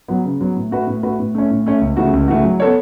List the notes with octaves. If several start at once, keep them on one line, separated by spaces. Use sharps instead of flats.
F#3 B3
C#3
F#3 B3
A2
A3 F#4 B4
A2
A3 F#4 B4
A2
A3 C#4
A2
A3 C#4
C#2
C#3 E3 A3 F#4
C#2
C#3 E3 A3 F#4
F#3
B3 A4 C#5